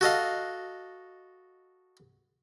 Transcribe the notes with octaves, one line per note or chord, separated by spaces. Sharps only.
F#4 A4 D#5 F5